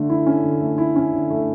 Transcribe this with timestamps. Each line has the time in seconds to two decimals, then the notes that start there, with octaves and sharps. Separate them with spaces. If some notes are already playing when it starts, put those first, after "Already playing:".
Already playing: D3 A3
0.10 E4
0.26 C#4
0.44 D3
0.61 A3
0.78 E4
0.96 C#4
1.13 D3
1.31 A3